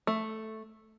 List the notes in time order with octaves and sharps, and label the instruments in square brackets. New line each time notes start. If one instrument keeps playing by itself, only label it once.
[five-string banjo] A3